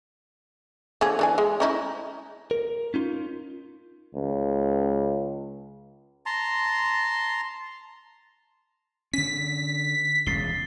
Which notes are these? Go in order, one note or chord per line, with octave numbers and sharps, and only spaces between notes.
D3 F3 G#4
E3 D4 G#5
G#3
C#4 D#4 E4
A#4
C#4 D#4 F4
C#2
A5 A#5 C6
D3 C#4 B6
E1 C#2 C#3 A6 C7 G7